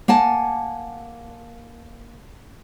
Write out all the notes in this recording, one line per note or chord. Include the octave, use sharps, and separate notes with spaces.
A#3 F#5 G#5 A5